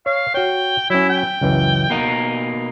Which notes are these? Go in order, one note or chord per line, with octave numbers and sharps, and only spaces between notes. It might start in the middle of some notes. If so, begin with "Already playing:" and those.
C#5 F5
F#4 C#5 G5
F#3 C#4 E4
G5
C#2 F#2 E3
B2 A#3 D#4 F#5